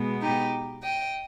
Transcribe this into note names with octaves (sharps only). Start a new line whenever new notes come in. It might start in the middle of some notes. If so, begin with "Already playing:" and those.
Already playing: B2 G#3 B3
D#4 G4
D#5 G5